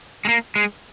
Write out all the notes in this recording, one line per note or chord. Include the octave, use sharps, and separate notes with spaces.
G#3
A#3
G#3